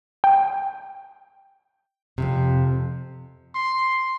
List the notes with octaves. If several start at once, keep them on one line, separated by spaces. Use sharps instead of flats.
G5
F2 A2 C3
C6